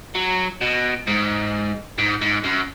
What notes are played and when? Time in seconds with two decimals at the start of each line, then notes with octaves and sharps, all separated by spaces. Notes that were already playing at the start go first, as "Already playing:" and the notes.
0.15 F#3
0.61 B2
1.07 G#2
1.98 G#2
2.22 G#2
2.44 F#2